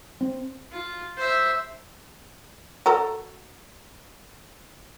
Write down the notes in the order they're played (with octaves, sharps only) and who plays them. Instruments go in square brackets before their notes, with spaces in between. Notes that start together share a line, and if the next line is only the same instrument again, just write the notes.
[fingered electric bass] C4
[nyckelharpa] F4
C5 E5
[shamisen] F#4 A4 A#5